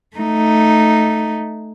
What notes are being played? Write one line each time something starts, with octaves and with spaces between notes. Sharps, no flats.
A3 D#4